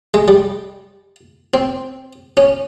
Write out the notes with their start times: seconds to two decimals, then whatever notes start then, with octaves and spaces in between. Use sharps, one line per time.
0.14 G#3
0.28 G3
1.54 C4
2.37 C#4